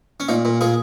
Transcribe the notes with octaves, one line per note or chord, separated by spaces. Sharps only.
C#4
A#2 D#4
A#2
A#2 G#4